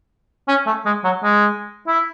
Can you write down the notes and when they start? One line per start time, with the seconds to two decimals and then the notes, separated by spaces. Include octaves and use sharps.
0.48 C#4
0.67 A3
0.86 G#3
1.04 F#3
1.23 G#3
1.88 E4